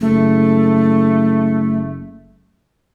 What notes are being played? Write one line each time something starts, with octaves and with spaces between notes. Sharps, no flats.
F#1 A3